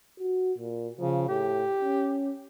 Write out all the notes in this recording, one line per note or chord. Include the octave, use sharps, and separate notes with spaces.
F#4
A#2
C#3 F3
A2 G4
C#4